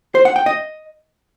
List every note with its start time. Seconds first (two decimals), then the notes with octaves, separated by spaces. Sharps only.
0.15 C5
0.25 F#5
0.36 G5
0.46 D#5